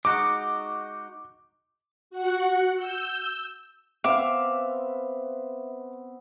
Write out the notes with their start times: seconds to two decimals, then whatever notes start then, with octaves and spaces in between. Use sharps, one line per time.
0.05 G#3 D#4 F#4 D6
2.10 F#4 F#5
2.77 E6 G6
4.04 B3 C4 B4 E5 F5 D6